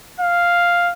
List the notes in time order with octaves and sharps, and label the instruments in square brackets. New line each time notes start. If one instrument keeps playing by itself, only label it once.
[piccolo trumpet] F5